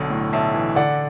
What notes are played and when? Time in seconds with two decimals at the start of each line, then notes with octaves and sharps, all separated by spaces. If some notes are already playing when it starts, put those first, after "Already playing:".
Already playing: B1 D3
0.10 A2
0.33 B1 E5 A5
0.54 E3
0.76 D3 D5 F#5